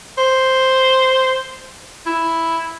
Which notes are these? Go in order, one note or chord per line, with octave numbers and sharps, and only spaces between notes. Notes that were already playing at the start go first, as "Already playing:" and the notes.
C5
E4